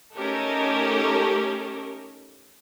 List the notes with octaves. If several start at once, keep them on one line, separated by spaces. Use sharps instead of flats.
A3 C#4 D#4 G4 A4 A#4